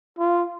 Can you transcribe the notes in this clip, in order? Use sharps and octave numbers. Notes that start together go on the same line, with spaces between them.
F4